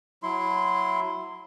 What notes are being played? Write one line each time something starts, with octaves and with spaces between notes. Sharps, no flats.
F#3 E4 C6